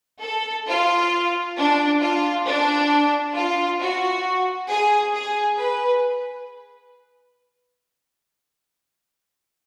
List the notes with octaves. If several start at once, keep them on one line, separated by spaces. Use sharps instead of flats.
A4
F4
D4
F4
D4
F4
F#4
G#4
G#4
B4